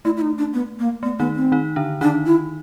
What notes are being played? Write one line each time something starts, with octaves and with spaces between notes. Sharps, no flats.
A3 E4
E4
D#4
D4
B3
A#3
A3 B3
D#3 B3 D#4
C4
D#3 D#4
D3 D4
D#3 D4 D#4
E4